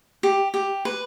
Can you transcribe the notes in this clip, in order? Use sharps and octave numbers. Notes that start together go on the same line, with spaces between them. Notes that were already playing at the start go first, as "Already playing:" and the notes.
G4
G4
B4